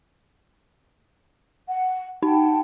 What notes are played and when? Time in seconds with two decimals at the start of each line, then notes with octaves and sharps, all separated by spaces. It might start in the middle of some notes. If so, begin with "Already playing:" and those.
1.68 F#5
2.23 D#4 F#5 G5 A5